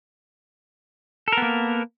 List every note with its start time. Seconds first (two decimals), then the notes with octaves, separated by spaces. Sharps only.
1.28 A4
1.32 A#4
1.37 B3
1.42 A#3